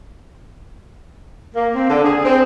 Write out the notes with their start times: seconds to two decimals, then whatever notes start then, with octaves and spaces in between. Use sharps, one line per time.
1.55 A#3
1.75 C4
1.89 D3
2.05 G#4
2.25 C4